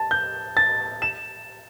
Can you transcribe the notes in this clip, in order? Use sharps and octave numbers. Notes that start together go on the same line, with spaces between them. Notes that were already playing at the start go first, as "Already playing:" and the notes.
Already playing: A5
G6
A6
E7